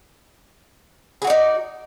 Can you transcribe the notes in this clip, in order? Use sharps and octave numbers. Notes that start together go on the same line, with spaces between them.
D#4 F#4 G#4 D5